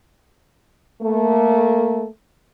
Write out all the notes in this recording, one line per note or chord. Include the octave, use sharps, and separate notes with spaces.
A3 A#3